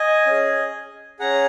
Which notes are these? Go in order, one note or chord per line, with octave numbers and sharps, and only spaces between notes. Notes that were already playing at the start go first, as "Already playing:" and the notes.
Already playing: D#5 G#5
C#4 G#4
C#4 G#4 F#5 A#5